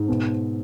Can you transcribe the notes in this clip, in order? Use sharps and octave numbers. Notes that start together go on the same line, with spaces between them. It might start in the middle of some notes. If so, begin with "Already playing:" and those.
Already playing: G#2 C5
B2